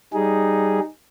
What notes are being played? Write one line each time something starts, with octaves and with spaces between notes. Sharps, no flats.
G3 D#4 G#4